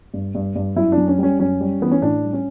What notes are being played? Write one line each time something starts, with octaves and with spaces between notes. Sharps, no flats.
G2
G2
G2
F#2 E4
D4
F#2
C#4
G3 C#4
F#2 C#4
G3
E3 B3
C#4
A2 D4
G3
C#4